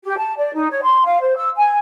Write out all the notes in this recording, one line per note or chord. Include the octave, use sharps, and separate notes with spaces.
G4
A5
D5
D#4
C#5
C6
F5
C5
E6
G#5